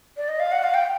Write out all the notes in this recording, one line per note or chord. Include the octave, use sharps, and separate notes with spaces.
D5
D#5
F5
F#5
F5
G5